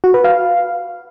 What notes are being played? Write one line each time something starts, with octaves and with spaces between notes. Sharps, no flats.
F#4
B4
F5